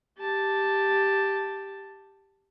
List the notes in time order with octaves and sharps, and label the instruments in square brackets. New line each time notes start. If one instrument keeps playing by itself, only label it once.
[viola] G4 A5